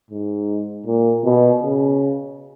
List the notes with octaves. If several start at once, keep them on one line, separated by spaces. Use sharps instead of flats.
G#2
A#2
B2
C#3